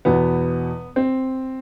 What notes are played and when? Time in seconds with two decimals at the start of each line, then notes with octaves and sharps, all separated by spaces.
0.05 E2 B2 B3
0.96 C4